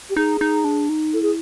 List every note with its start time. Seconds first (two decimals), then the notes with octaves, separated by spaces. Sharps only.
0.10 G4
0.16 D#4 G#4
0.41 D#4
0.65 D4
0.89 D#4
1.13 E4 A4
1.22 G#4